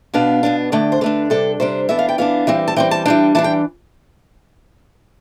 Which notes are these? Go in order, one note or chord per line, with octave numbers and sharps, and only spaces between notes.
B2 B3 D4 F5
B2 B3 D4
D3 A3 D4 G5
C5
D3 A3 D4 B4
C3 G3 D4 A4
C3 G3 D4 C5
E3 B3 D4 E5
F5
G5
E3 B3 D4 F5
E3 G3 C4
A5
E3 G3 C4 G5
A5
E3 G3 D4 G5
E3 G3 D4 A5
G5